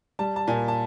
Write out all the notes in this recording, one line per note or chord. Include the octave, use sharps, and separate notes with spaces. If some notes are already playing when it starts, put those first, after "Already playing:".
G3 A5
A5
A#2 G#5
A5